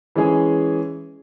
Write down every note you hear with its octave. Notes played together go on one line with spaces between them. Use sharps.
E3 G#3 C#4 G#4